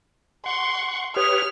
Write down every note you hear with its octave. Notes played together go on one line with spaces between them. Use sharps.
F#5 C6 C#6
G4 B4 C#5 D#6 F6